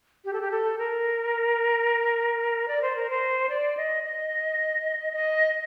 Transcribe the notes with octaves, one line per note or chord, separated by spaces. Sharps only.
G4
A4
G4
A4
A#4
D5
C5
A#4
C5
D5
D#5
D#5
D#5